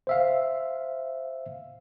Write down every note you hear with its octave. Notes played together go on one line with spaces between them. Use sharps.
C5 E5 F5